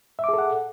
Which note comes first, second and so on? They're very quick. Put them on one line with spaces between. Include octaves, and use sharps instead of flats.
E5 D6 G#4 A4 F#5